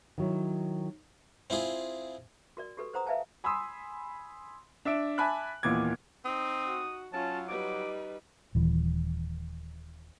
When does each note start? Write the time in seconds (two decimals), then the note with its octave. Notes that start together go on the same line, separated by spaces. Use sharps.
0.18 D#3 F#3 E4
1.50 C4 E4 F4 G#4
2.57 F#4 A#4 D5
2.77 F#4 G4 A4 B4
2.93 B4 C5 F#5 A#5 D#6
3.07 B4 E5 F5 G#5 A5
3.44 G#5 B5 C6 D#6 E6
4.85 D4 E5 E6 D7
5.18 E5 G#5 A5 B5 D6 F#6
5.63 D#2 A#2 E3 B3 D6 G#6
6.25 C4 D#4 D#6
6.67 F#4
7.13 F#3 C#4 F4 A5
7.49 G3 D#4 B4 D6
8.55 D#1 E3